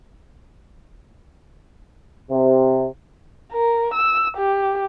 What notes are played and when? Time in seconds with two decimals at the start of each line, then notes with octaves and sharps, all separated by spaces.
2.30 C3
3.52 A#4
3.94 E6
4.37 G4